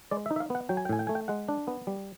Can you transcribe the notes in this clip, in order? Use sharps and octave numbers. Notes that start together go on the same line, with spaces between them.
G#3 D5
E5
D#4
E5
F5
B3 F#5
F#3 G5
G#5
G5
A2 G#5
G5
A3 G#5
G5
G#3 F#5
D4
B3
G3